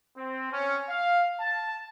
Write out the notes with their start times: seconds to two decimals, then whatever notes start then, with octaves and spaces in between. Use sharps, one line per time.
0.17 C4
0.52 C#4
0.89 F5
1.40 A5